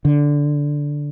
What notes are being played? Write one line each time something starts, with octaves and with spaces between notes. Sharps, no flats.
D3